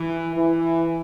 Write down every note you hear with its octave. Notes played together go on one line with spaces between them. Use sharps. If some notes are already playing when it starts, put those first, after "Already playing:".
Already playing: E3
E3